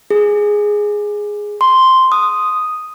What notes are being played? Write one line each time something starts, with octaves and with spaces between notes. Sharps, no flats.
G#4
C6
D#6